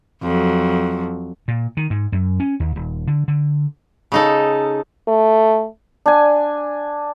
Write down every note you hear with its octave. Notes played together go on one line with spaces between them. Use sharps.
F2 F#3
A#2
D#3
G#2
F#2
C#4
D#2
D#1
D3
D3
C#3 D#4 A4
A3
D4 G#5